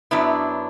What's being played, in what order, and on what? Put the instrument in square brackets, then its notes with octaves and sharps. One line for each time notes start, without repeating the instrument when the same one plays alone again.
[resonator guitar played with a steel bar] F#2 F#3 B3 D4 E4